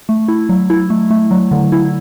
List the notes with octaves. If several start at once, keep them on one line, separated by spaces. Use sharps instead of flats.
A3
E4
F#3
E4
A3
A3
F#3
D3
E4